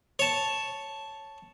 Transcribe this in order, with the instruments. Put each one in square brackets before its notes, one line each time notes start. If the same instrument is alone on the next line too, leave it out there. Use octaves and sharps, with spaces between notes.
[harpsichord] C#5 A5